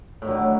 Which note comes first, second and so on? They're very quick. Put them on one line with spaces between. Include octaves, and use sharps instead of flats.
A2 D#3 F#3 D3